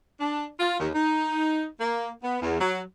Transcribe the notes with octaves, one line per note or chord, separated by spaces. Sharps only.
D4
F4
D#2
D#4
A#3
B3
E2
F#3